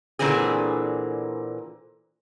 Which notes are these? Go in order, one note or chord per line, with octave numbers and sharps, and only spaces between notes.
A#2 D3 E3 C4 G#4